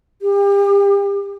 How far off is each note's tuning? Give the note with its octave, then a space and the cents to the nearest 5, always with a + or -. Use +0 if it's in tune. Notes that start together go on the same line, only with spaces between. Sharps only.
G4 +35